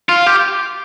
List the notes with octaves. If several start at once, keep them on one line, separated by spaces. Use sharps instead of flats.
F4
G4